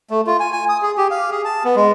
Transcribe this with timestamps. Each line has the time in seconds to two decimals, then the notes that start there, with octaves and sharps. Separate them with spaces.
0.10 A3
0.27 F4
0.40 G#5
0.52 G#5
0.69 D#6
0.82 G#4
0.98 G4
1.11 F5
1.31 G#4
1.45 A5
1.65 B3
1.76 G#3